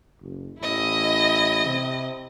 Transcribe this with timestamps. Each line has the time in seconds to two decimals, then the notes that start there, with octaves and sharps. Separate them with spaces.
0.21 F#1
0.60 A1 E4 D#5
1.66 C3